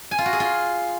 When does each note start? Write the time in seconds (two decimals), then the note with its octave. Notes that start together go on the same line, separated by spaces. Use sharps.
0.11 G#5
0.18 F4
0.26 F#4
0.33 G#4
0.40 F4